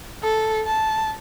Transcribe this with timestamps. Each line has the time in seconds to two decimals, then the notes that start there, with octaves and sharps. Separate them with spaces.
0.23 A4
0.66 A5